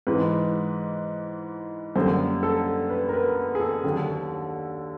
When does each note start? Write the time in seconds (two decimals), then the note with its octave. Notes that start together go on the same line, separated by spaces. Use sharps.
0.07 G#2 E3 G#3 B4
1.95 F#2 D3 G3 A#3 C5
2.43 A4
2.90 B4
3.09 A#4
3.13 B4
3.55 G#4
3.60 A4
3.84 D#2 D3 F#3